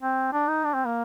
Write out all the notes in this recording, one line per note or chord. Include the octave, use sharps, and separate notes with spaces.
C4
D4
D#4
D4
C4
A#3